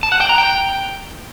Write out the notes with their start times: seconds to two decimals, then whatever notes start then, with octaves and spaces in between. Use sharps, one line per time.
0.03 A5
0.12 F#5
0.21 G5
0.29 A#5
0.38 G5